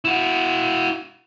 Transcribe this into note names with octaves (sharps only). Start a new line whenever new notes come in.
E4 F#4